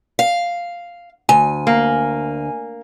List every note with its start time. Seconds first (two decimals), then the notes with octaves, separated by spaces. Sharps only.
0.19 F5
1.29 D2 G#5
1.67 A#3